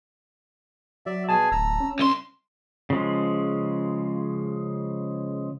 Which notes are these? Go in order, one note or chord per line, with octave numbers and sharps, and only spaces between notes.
F#3 D5 E5
B2 G#4 G#5 A5
D1 A#5 E6
C#4
C2 C6
C#3 F3 G#3